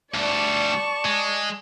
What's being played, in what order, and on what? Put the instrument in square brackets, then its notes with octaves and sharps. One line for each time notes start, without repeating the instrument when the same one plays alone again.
[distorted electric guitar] D2 G3 [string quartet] D5 A5 C#6
[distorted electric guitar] G#3